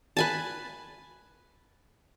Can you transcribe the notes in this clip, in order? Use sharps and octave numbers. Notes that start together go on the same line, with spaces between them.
B4 G#5 A5